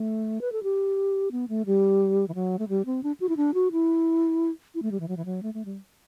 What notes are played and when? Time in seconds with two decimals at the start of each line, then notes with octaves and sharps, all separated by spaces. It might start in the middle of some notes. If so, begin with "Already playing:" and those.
Already playing: A3
0.41 B4
0.52 A4
0.63 G4
1.32 B3
1.49 A3
1.66 G3
2.28 E3
2.35 F#3
2.59 A3
2.69 G3
2.86 C4
3.03 D4
3.20 F#4
3.29 E4
3.37 D4
3.54 F#4
3.72 E4
4.75 E4
4.82 A3
4.92 G3
5.00 E3
5.08 F#3
5.17 E3
5.25 F#3
5.43 A3
5.54 A3
5.65 G3